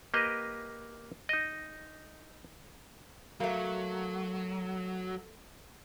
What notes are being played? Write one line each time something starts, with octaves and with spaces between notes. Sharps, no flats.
A#3 G4 B4 D#5 G5
D#4 D#5
F#3 A3 A#3